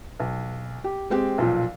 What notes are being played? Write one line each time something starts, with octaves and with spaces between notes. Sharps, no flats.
B1
G4
G#3 C4 G4
B1 A#2 F3